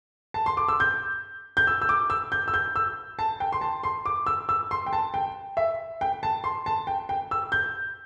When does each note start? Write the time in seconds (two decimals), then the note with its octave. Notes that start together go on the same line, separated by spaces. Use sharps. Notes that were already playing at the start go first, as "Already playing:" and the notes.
0.34 A5
0.46 C6
0.57 D6
0.68 E6
0.80 G6
1.57 G6
1.67 E6
1.82 E6
1.89 D6
2.10 E6
2.32 G6
2.48 E6
2.54 G6
2.76 E6
3.19 A5
3.40 G5
3.52 C6
3.61 A5
3.83 C6
4.06 D6
4.26 E6
4.49 E6
4.71 C6
4.86 G5
4.93 A5
5.14 G5
5.57 E5
6.01 G5
6.23 A5
6.44 C6
6.66 A5
6.87 G5
7.09 G5
7.31 E6
7.52 G6